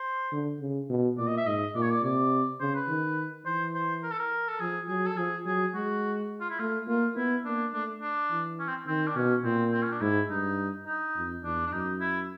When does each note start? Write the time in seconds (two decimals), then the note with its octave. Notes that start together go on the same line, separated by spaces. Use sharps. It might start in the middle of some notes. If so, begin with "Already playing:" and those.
Already playing: C5
0.32 D3
0.60 C#3
0.90 B2
1.18 A#2 D5
1.27 D#5
1.37 E5
1.46 G#2 D#5
1.75 A#2 D5
1.82 C#5
1.91 D5
2.03 C3 D5
2.61 C#3 C5
2.75 B4
2.88 D#3
3.45 E3 C5
3.74 C5
4.03 A#4
4.11 A4
4.19 A#4
4.48 A4
4.60 F3 G#4
4.88 F#3 G#4
5.06 A4
5.17 F3 G#4
5.45 F#3 G#4
5.74 G#3 F#4
6.41 F4
6.50 E4
6.59 A3 F4
6.87 A#3 F4
7.16 B3 E4
7.45 A#3 D4
7.73 A3 D4
8.02 D4
8.31 E3
8.59 C#4
8.68 C4
8.87 D#3 C4
9.07 D4
9.16 B2 C#4
9.44 A#2 C4
9.73 C4
9.82 C#4
9.92 D4
10.01 G#2 E4
10.30 G2 D#4
10.87 D#4
11.16 F2
11.44 E2 D4
11.66 D4
11.72 F#2 D#4
12.00 E4